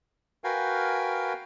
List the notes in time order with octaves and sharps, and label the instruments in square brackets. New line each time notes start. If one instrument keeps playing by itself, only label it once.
[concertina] F#4 A#4 B4 F5 G5 G#5